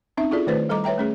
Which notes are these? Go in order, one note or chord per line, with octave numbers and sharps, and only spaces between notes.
C4 C#4 D#4 E5
E4 F4 G#4 A4 D5
D#3 A3 B4 C5 D5
G3 A4 D#5 A#5 D6
B4 C#5 E5 G5 A#5
A3 C#4 G#4